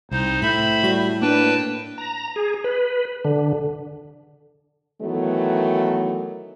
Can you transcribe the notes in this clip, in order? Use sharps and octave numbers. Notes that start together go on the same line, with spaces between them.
C2 D#4 C5
A2 C5 E5 B5 B6
G3 F#4 B6
A#3 D4 B4 G5 A5
A#5
G#4
B4
D3
D#3 E3 F#3 A3 B3